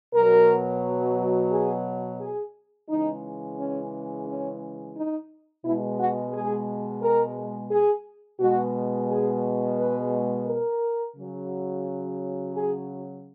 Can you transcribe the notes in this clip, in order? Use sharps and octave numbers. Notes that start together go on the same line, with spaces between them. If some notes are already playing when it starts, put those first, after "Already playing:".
B2 F#3 A#4
G#4
G#4
C#3 E3 G#3 D#4
C#4
C#4
D#4
B2 G#3 E4
F#4
G#4
A#4
G#4
B2 G#3 F#4
G#4
B4
A#4
C#3 F#3
G#4